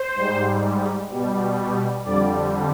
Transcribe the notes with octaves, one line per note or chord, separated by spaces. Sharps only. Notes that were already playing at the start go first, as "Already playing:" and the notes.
Already playing: C5
G#2 G3
B2 G3
F2 D3 G3 D5